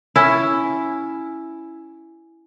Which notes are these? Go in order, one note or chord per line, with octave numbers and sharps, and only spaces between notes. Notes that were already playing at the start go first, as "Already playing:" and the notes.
C#4 E4